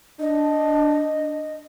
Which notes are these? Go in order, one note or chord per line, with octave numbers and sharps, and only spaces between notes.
D4 D#5